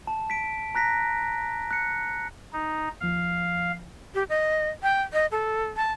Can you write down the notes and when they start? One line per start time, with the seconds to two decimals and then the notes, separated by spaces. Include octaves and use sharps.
0.07 A5
0.30 B6 D7
0.75 A#5 F#6 A#6 B6
1.71 F#6 C#7
2.53 D#4
3.00 D#2 F3 F5
4.14 G4
4.29 D#5
4.83 G5
5.13 D#5
5.31 A4
5.76 A5